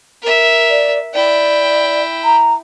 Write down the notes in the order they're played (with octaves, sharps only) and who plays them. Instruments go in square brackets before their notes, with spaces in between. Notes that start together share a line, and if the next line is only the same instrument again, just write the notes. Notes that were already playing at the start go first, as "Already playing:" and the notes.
[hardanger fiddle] A#4 E5
[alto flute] D5
[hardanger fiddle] E4 G5 [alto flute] D5
[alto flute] A#5